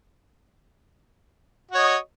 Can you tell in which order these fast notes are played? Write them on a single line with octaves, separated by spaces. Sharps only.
F#4 C#5 D#5